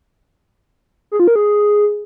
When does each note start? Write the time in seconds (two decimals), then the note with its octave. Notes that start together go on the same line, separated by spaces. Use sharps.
1.12 G#4
1.20 F4
1.28 A#4
1.36 G#4